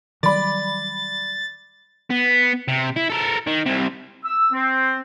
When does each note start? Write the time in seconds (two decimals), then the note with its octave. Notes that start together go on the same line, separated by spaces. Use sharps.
0.23 D#3 F#3 G3 D5 B5 A6
2.10 B3
2.68 C3
2.96 E4
3.09 A4 A#4
3.47 D#3
3.66 C2 C3
4.24 E6
4.53 C4